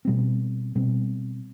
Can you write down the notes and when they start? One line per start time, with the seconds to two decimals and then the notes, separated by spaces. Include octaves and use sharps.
0.05 B2 G3 C4
0.75 B2 G3 C4